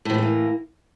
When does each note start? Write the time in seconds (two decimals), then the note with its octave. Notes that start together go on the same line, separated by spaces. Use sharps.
0.05 A2
0.10 F3
0.14 E3
0.18 A3
0.23 A#3